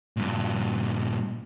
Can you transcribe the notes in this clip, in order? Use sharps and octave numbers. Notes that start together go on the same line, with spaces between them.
G2 A#2